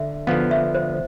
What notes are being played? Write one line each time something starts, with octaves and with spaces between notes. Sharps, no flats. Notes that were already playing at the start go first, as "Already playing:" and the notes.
Already playing: D3 E5
D3 F3 B3 F5
E5
C5